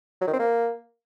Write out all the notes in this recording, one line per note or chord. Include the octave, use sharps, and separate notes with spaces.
F#3
D#3
C4
A#3